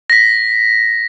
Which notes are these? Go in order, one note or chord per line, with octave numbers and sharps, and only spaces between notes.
A#6 B6